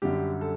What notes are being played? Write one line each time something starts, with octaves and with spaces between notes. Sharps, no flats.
F#2 D3 G3 G4
A4